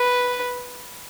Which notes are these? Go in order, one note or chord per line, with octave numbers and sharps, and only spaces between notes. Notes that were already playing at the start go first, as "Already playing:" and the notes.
Already playing: B4